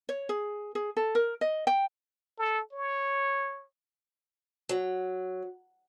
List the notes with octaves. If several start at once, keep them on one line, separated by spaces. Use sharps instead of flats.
C#5
G#4
G#4
A4
A#4
D#5
G5
A4
C#5
F#3